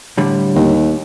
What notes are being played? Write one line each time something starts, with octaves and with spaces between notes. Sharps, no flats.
A2 D3 G3
D#2